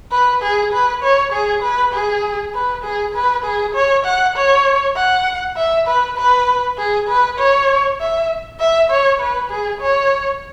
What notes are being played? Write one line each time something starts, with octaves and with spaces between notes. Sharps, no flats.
B4
G#4
B4
C#5
G#4
B4
G#4
B4
G#4
B4
G#4
C#5
F#5
C#5
F#5
E5
B4
B4
G#4
B4
C#5
E5
E5
C#5
B4
G#4
C#5